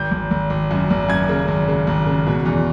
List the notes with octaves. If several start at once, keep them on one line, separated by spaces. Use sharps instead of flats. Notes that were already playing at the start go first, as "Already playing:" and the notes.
Already playing: G#1 G6
G#1
G#1
G#1
F#2
G#1
F#2 G#6
C#3
G#1
C#3
G#1
C#3
B2
E2